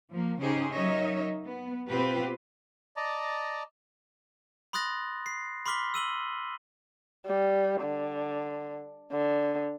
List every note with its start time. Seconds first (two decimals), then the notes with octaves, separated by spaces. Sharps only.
0.11 F3 A#3
0.41 C#3 C#4 D#4 G4 G#4 C5
0.72 F#3 D#4 A#4 C#5 D#5 E5
1.44 B3
1.88 B2 B3 C4 F4 G4 B4
2.97 D5 D#5 A5 A#5
4.73 B5 C6 D#6 F#6 A6 A#6
5.26 C7
5.66 B5 C6 D6 F6 B6 G7
5.94 E6 D#7 F#7 G7
7.26 G3
7.82 D3
9.12 D3